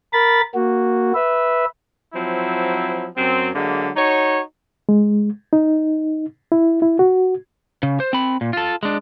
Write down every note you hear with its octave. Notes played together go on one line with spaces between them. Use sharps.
A#4 B5 A6
A#3 F#4
B4 E5
F3 F#3 C4 E4
F#2 F#3 C4
D3 F#3 G#3 A#3
D#4 F#4 C#5
G#3
D#4
E4
E4
F#4
C#3
C5
C4 B5
A#2
F4 A4
G#3 D4